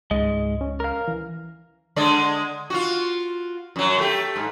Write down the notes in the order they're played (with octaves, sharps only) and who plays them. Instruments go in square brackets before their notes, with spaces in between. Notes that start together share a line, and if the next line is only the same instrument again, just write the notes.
[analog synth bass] C#2 [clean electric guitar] G#2 G#3 [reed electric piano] D#5
[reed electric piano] C#4
[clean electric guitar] A#4 F5
[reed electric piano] E3
[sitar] D3 G#3 D5
F4 F#4
F#2 F#3
A3 G4
G#2